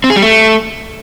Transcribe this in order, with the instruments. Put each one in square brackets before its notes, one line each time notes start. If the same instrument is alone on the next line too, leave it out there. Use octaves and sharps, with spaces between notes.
[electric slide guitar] C4
G#4
G3
A3